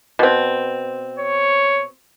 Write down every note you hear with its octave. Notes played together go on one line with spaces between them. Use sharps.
B2 C4
C#5